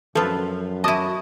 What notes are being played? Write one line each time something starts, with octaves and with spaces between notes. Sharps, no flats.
F#2 F3 F4 A4 B4
E4 F#4 D#5 A5 D6 D#6